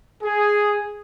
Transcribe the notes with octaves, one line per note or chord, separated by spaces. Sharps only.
G#4